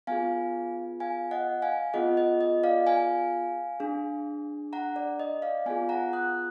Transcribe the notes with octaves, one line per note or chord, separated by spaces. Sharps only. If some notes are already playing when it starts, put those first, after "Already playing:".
B3 F4 G#4 F5 G#5
F5 G#5
D#5 F#5
F5 G#5
B3 F4 G#4 D#5 F#5
D#5
D#5
D5 F5
F5 G#5
D4 G#4
F#5 A#5
D5
D#5
D5 F5
B3 F4 G#4 F5 G#5
F#5 A#5
D#6 F#6